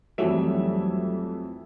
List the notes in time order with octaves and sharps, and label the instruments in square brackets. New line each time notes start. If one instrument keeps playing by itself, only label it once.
[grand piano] F2 E3 E5 [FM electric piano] F#3 G3 A3